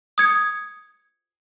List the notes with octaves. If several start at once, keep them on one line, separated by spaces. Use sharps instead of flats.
D#6 G#6 C#7